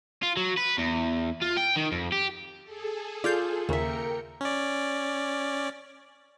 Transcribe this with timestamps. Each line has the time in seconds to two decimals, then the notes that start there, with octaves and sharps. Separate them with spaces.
0.23 F4
0.37 F#3
0.57 B4
0.78 E2
1.42 F4
1.57 G5
1.76 D#3
1.92 F2
2.12 G4
2.64 G#4 A4
3.24 F4 D5 F5 G6
3.69 D#2 C#3 A#3 A#4 E5 G5 C#7
4.41 C#4 D5